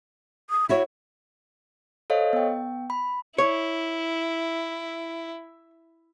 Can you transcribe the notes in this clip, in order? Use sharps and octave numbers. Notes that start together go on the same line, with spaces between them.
D#6
E4 F#4 C#5 E5
A4 C5 C#5 D#5 F5
B3 G5
B5
E4 C#5